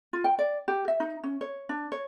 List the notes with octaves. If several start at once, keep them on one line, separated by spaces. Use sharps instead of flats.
F4
G5
D5
G4
E5
D#4
C#4
C#5
D4
C#5